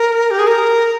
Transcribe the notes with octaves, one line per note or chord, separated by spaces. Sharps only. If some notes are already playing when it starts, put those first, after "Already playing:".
Already playing: A#4
G4
G#4
A#4